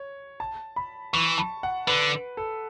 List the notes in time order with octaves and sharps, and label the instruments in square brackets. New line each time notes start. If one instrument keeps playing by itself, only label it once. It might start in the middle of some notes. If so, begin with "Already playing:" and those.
Already playing: [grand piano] C#5
A5
B5
[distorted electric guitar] E3 [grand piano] C#6
[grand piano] A5
F#5
[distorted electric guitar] D3 [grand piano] B4
[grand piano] A4